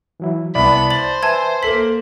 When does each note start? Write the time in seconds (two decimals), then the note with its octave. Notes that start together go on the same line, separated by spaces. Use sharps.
0.20 E3 F#3 E4
0.55 C2 B3 D5 A5 B5
0.91 C5 A6 F#7
1.23 B4 E5 G#5 A5 G#6
1.63 A#3 A4 B6 F#7